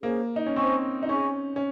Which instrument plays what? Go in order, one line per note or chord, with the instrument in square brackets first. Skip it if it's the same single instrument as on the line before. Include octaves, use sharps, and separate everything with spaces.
[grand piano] A#3 [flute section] C#4 G#4 C5
[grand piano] D#4
C#4
[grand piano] C4 [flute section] C5 D#5 G#5 C#6
[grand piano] D#4
[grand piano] C#4 [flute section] G#4 D#5 G#5 C#6
[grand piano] C#4